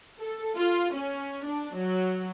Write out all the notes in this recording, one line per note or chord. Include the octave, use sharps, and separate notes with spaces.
A4
F4
C#4
D4
F#3